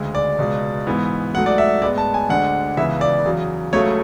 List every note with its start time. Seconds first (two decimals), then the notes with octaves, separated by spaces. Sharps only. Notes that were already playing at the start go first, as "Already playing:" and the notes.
Already playing: D2 C#3 G#3
0.15 D5
0.39 C#2 B2 G#3
0.87 G#2 E3 B3
1.33 G#2 F#3 A3 F#5
1.46 D5
1.58 E5
1.82 A2 G#3 B3 D5
1.98 A5
2.14 G#5
2.29 D2 D3 G#3 D4 F#5
2.77 C#2 C#3 E3 B3 E5
3.01 D5
3.25 E2 C#3 F#3
3.73 C#2 C#3 F#3 A3 C#5